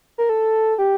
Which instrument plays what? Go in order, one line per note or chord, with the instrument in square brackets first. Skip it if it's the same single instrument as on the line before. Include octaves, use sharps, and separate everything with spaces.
[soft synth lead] A#4
A4
G4